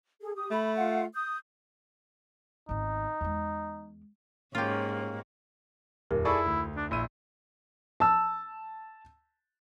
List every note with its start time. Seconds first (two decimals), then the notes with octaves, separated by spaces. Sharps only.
0.20 G#4 A4
0.35 G4 D#6
0.51 A3 B5
0.76 F4 F5 F#5
1.14 D#6 G6
2.69 G#1 B3 D#4
3.21 E2 G#3
4.55 G#2 A#3 C#4 F4 G4
6.11 D#1 F2 G4 A#4
6.25 E4 G#4 A4 D5 B5 C#6
6.45 D2
6.77 D4
6.91 A#1 E4 D#7
8.00 A5 E6